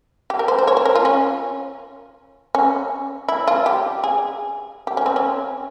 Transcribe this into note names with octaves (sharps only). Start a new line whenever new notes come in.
G4
A#4
C5
C5
C#5
C5
A#4
F4
C#4
C#4
E4
F4
G4
G#4
G4
C#4
C4
C#4